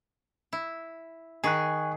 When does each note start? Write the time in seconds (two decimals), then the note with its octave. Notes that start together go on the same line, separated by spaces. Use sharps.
0.53 E4
1.44 D#3 G#4 G#5 C#6 F#6